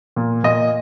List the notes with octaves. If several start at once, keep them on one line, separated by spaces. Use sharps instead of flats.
A#2
A#2 D#5